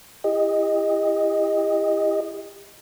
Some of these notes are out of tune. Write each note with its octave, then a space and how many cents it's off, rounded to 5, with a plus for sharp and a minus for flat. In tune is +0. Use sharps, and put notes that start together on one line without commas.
E4 +20 G4 +40 D#5 +0